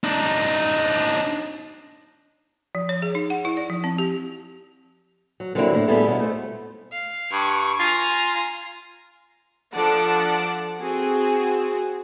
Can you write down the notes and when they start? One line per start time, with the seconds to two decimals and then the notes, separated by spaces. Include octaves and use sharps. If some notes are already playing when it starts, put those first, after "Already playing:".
0.04 D4 D#4
2.75 F3
2.89 C#5
3.02 G#4
3.15 D#4
3.30 F#5
3.45 E4
3.57 D5
3.70 F3
3.84 C4
3.98 G4
5.40 F#3
5.55 D3 F#3 G3 A#3 C4 E4
5.74 A2
5.88 D2 G3 B3 E4 G#4 A4
6.08 B2 C#4
6.20 A3 C5
6.92 F5
7.32 G2 C#6
7.79 F4 G#5 A#5
9.72 F3 D4 A4 D5 F#5 A5
10.81 C4 F#4 G#4